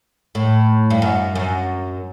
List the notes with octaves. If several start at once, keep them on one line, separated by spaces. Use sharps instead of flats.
A2
G2
F#2
F#2